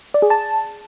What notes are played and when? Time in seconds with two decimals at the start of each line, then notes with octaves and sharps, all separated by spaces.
0.14 D5
0.22 G#4
0.30 A5